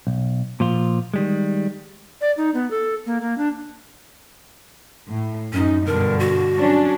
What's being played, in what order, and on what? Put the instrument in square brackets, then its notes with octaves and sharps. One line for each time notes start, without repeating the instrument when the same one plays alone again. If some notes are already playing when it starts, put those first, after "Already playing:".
[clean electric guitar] B1
A#2 F3 F4
D#3 G3 G#3
[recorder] D5
D#4
B3
A4
A#3
A#3
D4
[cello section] A2
[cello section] F#2 D#4 [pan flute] C#4
[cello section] G2 B2 D3 [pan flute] A#4
[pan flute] F#4
[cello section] F#3 C#4 D4